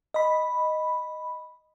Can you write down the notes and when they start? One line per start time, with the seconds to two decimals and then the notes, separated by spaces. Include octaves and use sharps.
0.14 D#5 B5